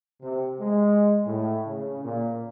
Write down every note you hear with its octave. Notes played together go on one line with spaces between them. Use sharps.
C3
G#3
A2
C#3
A#2